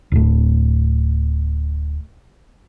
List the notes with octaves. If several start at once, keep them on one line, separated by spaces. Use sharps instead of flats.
D1 A2